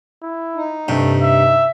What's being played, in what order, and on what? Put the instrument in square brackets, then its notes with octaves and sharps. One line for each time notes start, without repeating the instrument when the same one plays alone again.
[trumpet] E4
[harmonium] D#4
[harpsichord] G2 C3 [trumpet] A3
[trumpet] E5